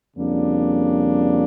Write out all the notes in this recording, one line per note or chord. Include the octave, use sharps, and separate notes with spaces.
F2 C#3 G3 A#3 D4